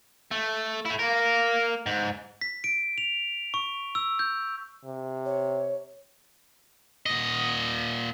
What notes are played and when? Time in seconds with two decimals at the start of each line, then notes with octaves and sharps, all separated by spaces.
0.31 A3
0.85 A3 E4
0.99 A#3 A#4
1.86 G#2
2.41 B6
2.64 D7
2.98 F7
3.54 C#6
3.95 E6
4.19 G6
4.85 C3
5.25 C#5
7.06 A#2 D#5